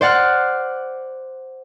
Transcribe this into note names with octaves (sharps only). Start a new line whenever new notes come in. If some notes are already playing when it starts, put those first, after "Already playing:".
C5 D5 F#5 F6 F#6